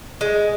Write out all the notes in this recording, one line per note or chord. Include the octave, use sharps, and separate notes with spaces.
G#3